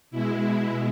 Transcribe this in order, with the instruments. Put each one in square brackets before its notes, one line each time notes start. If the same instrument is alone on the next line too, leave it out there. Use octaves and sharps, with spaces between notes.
[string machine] B2 G#3 E4